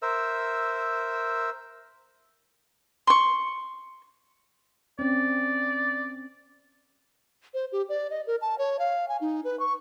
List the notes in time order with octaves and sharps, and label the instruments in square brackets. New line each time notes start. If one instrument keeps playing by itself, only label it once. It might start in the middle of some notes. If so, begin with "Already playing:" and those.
[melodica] A#4 C5 E5 E6
[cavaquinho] C6 C#6
[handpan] C4 C#4 [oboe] D5
[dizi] C5
G4
D5
D#5
A#4
A5
C#5
F5
G#5
D#4
B4
C#6